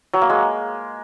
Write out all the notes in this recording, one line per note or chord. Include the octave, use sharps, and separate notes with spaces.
F#3
A#3
G#3